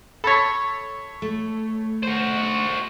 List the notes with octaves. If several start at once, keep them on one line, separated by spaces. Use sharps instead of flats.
A4 C#5 B5 A6 B6
A3
F#4 C5